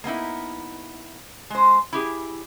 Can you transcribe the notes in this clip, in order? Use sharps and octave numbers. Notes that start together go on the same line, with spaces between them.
A#3 B3 D#4 E4
G#3 C5
E4 G4 G#4